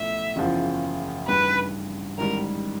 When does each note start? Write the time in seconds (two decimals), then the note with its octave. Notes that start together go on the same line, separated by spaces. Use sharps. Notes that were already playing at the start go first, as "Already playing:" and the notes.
Already playing: B1 A2 F3 A3 C#4 E5
0.36 F#1 E2 C#3 F3
1.27 A1 G2 D#3 G3 B4
2.18 A1 G#2 D#3 G3 A#4